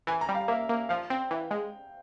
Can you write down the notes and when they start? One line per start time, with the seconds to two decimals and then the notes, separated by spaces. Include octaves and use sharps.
0.07 E3 G#5
0.21 A#5
0.29 G3
0.35 F5
0.48 A#3 E5
0.69 A#3
0.89 F3 F5
1.10 C4 G5
1.31 E3
1.51 G#3